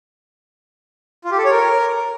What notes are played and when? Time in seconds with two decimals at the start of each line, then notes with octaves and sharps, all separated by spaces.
1.25 F4
1.31 G4
1.38 A4
1.45 C#5
1.51 A#4